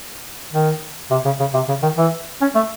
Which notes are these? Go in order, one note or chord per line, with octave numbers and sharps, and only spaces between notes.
D#3
C3
C#3
C#3
C3
C#3
D#3
E3
C#4
A3